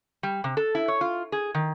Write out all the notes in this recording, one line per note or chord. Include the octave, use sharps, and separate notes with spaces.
G3
C3
A4
E4
C#5
F4
G#4
D#3